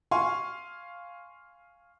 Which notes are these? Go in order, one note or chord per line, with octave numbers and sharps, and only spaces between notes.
F5 G#5 C6 C#6